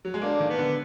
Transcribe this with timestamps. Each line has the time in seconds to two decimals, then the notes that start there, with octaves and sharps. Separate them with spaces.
0.05 F#3
0.14 G#3
0.21 D3 A#3 D4
0.40 D#3
0.50 B3
0.58 D3